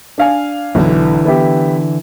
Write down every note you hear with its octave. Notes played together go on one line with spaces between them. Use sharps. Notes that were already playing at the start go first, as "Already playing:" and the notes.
D4 F5 G#5
B1 D3 E3
B3 E4 G4